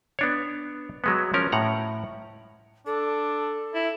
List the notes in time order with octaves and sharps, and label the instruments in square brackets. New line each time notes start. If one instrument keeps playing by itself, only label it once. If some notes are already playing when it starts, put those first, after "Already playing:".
[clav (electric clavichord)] B3 D4 C#5
F#3 G#3 B3
F3 C#4 A#4
A2 F#5 A#5
[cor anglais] D4 [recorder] A4
[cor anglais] E4